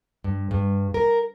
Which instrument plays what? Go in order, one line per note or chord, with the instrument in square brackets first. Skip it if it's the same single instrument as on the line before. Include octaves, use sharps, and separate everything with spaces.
[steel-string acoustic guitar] G2
G2
A#4